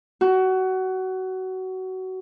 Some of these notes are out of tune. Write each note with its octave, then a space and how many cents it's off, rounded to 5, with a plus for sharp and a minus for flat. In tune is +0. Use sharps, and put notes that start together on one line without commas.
F#4 +20